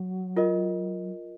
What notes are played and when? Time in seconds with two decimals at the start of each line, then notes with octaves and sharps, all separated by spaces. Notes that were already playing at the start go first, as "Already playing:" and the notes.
Already playing: F#3
0.36 F4 A#4 D#5